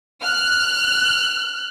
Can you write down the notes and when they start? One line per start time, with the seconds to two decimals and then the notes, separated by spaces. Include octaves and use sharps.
0.22 F6 F#6